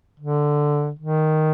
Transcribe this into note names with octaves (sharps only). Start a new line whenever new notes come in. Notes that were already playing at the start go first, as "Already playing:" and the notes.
D3
D#3